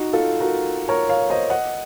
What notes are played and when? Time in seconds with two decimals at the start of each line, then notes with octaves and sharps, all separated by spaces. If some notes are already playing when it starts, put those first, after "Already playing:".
Already playing: D#4 F#4
0.13 F4 A4
0.40 F#4 A#4
0.89 A#4 C#5
1.09 C#5 F5
1.30 C5 D#5
1.50 D#5 F#5